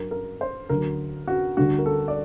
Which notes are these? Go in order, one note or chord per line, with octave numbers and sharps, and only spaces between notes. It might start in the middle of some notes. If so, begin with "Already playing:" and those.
Already playing: G2 F#3 A#4
A#4
C5
D2 D3 F#3 A#4
F#4
D2 D3 G3 F#4
A#4
A4
D5